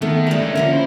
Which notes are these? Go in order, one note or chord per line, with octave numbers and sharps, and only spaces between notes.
D#3 A3 B3
G3 D4 A#4 E5
A2 G#3 C#4 A4
D3 A#3 C#4 F4 A#4
E4 C5